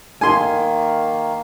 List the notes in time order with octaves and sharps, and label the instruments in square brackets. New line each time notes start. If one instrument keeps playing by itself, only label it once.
[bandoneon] D#3 A#3 [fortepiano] G#5 C6